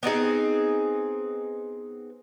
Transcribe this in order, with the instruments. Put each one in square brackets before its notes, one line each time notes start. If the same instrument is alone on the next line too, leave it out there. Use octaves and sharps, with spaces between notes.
[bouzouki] B3 C4 D#4 G#4